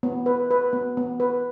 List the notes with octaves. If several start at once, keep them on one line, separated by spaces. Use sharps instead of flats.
B3
B4
B4
B3
B3
B4